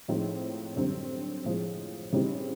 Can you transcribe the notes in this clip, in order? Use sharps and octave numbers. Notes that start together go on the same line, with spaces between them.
A2 F3 G#3 C4 D#4
F#2 D3 G3 C4
A2 F3 G#3
C#3 E3 G3 C4 D#4